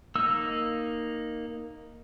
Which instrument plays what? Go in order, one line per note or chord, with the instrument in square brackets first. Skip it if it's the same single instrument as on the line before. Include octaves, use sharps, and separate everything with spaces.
[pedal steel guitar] A#3 D#4 E6